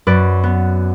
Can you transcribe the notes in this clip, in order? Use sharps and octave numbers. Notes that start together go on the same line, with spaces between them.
F#2 B4 D5
B3